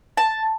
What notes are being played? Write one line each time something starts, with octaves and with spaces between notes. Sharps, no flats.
A5